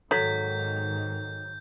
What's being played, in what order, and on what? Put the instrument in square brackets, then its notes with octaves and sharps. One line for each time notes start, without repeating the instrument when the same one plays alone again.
[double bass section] G#2 D#3 [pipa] F#3 [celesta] A4 B6 [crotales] G6